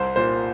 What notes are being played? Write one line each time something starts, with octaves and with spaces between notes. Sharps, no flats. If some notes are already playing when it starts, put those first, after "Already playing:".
Already playing: C2 C5
A#2 C5